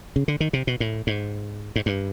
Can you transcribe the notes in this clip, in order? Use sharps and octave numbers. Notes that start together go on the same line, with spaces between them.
C#3
D3
D#3
C3
B2
A2
G#2
G#2
G2